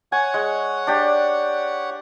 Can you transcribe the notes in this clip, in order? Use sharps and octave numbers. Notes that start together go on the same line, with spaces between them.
C#5 F#5 G#5
G#3
D4 G4